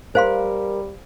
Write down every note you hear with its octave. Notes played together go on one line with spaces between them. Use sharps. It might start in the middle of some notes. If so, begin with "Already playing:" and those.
G3 A#4 C5 F5 C6